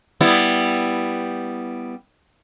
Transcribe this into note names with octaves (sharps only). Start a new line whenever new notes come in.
G3 B3 E4